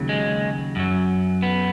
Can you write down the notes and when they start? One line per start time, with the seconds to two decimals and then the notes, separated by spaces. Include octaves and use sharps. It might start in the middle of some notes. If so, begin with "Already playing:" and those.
Already playing: D#2 C#3 F#3
0.09 G#3
0.76 F#2 F#3
1.43 B3